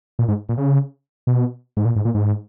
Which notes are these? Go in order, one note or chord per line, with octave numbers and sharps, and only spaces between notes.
A#2
G#2
A#2
C#3
B2
G#2
A#2
G#2
A#2
G#2